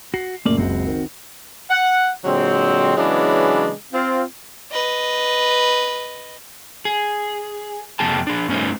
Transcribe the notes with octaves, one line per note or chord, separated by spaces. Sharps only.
F#4 C7
F#2 A#2 C#3 A3 A#3 D5
F#1 C#2 C4 F#4
D#3
F#5
A#2 D3 F#3 G#3 C4
C#3 E3 F#3 G#3 B3 D4
C4 F4
B4 D#5
G#4
F2 C3 A#3 G#4 G5 A5
D4 G#4
G2 A3 C#4 D#4 C5